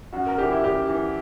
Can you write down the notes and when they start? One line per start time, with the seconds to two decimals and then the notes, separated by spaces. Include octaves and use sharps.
0.13 F#2 F#4
0.26 A#4
0.38 E3 G4
0.51 E4
0.64 F#2 G4
0.89 E3